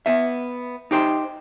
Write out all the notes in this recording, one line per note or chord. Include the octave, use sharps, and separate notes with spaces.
B3 E5
D#4 G4 C5